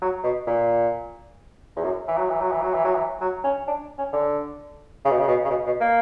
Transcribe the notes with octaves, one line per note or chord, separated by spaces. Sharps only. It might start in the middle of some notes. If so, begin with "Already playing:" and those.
F#3
B2
A#2
E2
F#2
E3
F#3
E3
F#3
E3
F#3
E3
F#3
E3
F#3
C#4
D4
C#4
D3
C#3
B2
C#3
B2
C#3
B2
B2
A#3